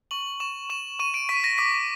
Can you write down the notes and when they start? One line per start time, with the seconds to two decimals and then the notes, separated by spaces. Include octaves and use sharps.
0.11 C#6 F#7
0.40 C#6 E7
0.70 C#6 E7
0.99 C#6 D#7
1.14 D7
1.29 C#6 B6
1.44 A#6
1.58 D6 B6